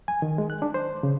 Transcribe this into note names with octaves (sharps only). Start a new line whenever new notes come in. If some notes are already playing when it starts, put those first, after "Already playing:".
G#5
D#3
G#3
F#6
D4
C5
C#3